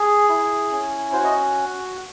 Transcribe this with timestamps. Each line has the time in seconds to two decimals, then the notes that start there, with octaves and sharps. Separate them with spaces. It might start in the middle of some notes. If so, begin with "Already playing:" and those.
Already playing: G#4
0.29 E4
0.71 C#4
1.12 F#4 C5
1.24 D#5